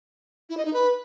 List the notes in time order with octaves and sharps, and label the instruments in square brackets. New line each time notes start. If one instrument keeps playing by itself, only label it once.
[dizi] E4
D#5
D#4
B4